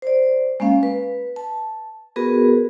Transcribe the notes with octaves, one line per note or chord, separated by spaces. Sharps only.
C5 D5
G#3 A#3 C#4 F5
B4
A5
B3 F#4 G#4 A#4 B4